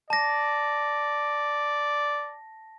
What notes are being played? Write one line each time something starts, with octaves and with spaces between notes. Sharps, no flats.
D5 A5 A#6